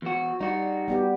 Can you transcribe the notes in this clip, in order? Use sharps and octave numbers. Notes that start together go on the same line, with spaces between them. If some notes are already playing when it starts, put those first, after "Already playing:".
E2 F#4
G3 D#4 F#4
G3 B3 G4